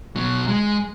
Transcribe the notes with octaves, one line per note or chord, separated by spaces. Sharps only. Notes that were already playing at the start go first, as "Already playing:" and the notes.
B2 F#3
G#3